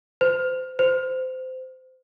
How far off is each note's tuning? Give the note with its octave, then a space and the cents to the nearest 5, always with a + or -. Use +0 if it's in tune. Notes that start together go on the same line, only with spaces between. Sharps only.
C5 -30
C5 -20